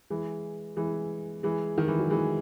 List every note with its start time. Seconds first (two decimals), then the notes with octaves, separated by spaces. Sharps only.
0.10 E3 G#3
0.76 E3 G#3
1.43 E3 G#3
1.78 D#3
1.88 E3
1.99 F#3
2.10 E3 G#3